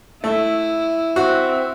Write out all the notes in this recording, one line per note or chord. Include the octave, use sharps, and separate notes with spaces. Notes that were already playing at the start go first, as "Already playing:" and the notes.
A3 E4
C4 F#4 E5